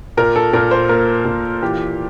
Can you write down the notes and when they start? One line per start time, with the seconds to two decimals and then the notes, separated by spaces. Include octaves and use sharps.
0.17 A#2 A#4
0.36 A4
0.53 A#2 A#4
0.71 C5
0.89 A#3 A#4
1.25 A#2
1.62 E3 G4